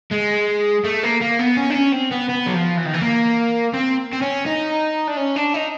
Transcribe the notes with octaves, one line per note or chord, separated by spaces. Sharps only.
G#3
A3
A#3
A#3
B3
C#4
D4
C#4
C4
B3
B3
F#3
F3
E3
D#3
E3
A#3
C4
C4
C#4
D#4
D4
C#4
D4
D#4